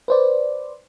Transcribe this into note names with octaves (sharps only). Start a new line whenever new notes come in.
B4 C5 D5